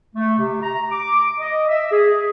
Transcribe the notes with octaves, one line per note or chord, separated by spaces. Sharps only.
A3
C3
A#5
D6
D#5
E5
G#4